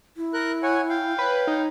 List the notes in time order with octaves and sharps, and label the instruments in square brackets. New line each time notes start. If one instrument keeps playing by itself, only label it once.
[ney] E4
[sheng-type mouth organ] A#4 F#6
C#5 F#5 G#5
F5 G5
[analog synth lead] B4 [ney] C#5
[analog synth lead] D#4